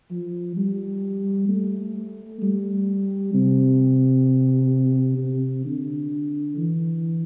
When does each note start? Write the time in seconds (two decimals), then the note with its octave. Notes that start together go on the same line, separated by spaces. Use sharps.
0.11 F3
0.57 G3
1.49 A3
2.42 G3
3.34 C3
5.18 C3
5.65 D3
6.57 E3